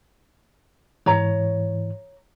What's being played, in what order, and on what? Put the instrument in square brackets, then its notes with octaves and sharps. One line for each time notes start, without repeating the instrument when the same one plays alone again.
[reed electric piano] G#2 E3 [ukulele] C#5 A#5